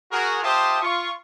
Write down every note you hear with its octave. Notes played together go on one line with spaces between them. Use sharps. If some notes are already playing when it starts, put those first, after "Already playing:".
F#4 G#4 A#4
F4 G4 C5 E5 A5 D#6
F4 C#6